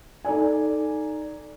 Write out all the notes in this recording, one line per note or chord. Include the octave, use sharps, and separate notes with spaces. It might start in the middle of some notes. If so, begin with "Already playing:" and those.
D#4 A4 D5 G#5